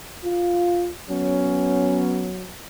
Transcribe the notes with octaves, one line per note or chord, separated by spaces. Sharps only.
F4
F#3 B3 C#4